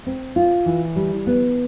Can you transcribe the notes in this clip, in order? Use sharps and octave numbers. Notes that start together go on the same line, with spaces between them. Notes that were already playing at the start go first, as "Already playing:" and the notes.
C4
F4
E3
G3
B3